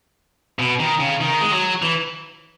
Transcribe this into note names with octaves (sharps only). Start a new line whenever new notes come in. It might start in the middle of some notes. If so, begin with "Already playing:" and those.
B2
D#3
C#3
D#3
G#3
F#3
E3